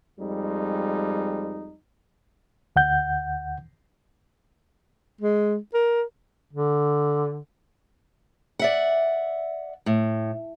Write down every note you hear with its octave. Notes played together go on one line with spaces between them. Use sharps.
F2 G3 G#3 D#4
D2 F#5 G6
G#3
A#4
D3
D5 E5 F#5
A2